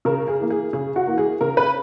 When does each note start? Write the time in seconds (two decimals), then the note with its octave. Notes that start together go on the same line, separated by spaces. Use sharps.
0.05 C#3 A#4
0.28 G#4
0.40 E3 A#3
0.50 G#4
0.73 C#3 G#4
0.96 F#4
1.07 E3 A#3
1.18 G#4
1.41 C#3 A#4
1.57 B4